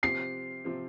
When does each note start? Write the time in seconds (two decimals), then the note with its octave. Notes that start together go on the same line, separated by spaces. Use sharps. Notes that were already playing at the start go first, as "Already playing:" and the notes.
0.03 C3 F3 C4 G4 C7
0.65 C3 F3 C4 G4